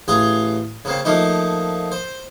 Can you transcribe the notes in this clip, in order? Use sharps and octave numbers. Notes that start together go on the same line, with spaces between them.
A1 G#4 F5 C6
C#3 A#3 C4
F3 A3 A#3 D#4
C5